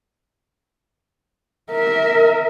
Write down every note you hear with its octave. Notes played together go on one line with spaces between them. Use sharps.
A#4 E5